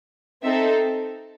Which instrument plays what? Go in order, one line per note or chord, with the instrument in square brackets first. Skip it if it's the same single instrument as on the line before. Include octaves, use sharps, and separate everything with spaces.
[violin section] C4 D#4 A4 E5